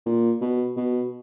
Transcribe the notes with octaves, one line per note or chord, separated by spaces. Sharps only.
A#2
B2
B2